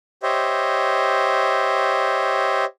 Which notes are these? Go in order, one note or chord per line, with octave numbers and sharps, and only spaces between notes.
G4 C5 C#5 D#5 E5